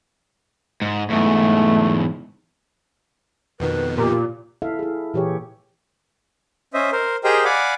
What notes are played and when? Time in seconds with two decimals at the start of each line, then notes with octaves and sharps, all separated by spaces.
0.82 G#2
1.10 E2 G#2 A3
3.60 F2 B2 D#3 B4
3.98 A#2 G4
4.62 E4 A4 E5 F5
4.79 E4 G#4
5.14 A#2 E3 G4 G#4 C#5
6.74 C#4 C5 D#5 E5
6.92 A#4 C5
7.24 G4 G#4 A#4 C5 D#5 G5
7.45 D5 F5 F#5 G#5 B5 D6